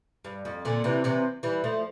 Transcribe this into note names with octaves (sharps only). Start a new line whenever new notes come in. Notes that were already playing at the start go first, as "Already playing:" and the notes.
G2
F2
A#2 D3
C3 E3
C3 E3
E3 G3
F3 A3